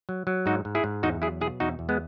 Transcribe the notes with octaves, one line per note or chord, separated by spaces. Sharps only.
F#3
F#3
G#2 D#4 F#4
G#2
E4 G#4
G#2
E2 D#4 F#4
F#3 E4 G#4
B2 E4 G#4
E2 D#4 F#4
E2
G#3 B3